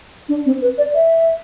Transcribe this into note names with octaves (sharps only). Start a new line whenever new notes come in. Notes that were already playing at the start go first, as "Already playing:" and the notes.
D4
C4
B4
D5
E5